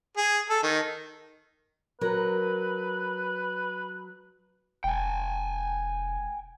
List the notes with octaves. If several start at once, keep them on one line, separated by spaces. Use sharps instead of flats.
G#4
A4
D#3
F#3 A#4 B4
E1 G5 G#5